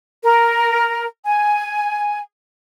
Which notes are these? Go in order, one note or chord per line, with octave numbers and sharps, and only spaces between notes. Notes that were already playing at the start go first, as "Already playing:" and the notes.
A#4
G#5